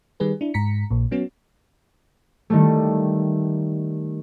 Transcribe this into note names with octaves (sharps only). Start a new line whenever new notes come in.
D#3 G3 G#4 B4
D4 E4
G#2 A#5 B6 C#7
A#1 A#2
F#3 B3 C#4 F#4
D#3 G3 A3